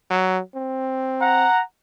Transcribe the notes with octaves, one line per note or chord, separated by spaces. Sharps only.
F#3
C4
F#5 A#5